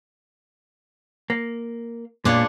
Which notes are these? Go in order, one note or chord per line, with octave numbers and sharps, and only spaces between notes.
A#3
A#2 G#3 B3 D4 F4 C#5